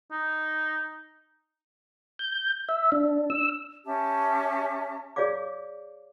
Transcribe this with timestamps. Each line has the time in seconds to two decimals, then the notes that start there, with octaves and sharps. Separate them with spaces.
0.11 D#4
2.19 G6
2.69 E5
2.92 D4
3.30 E6
3.85 C#4 G4 E5 A5
5.16 G#4 C#5 D5 F5 D6